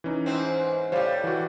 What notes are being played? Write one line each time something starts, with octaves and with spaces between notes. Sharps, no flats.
E3 C#4 D#4
G#2 C4
A2 G3 C5 C#5 F5
E3 F#4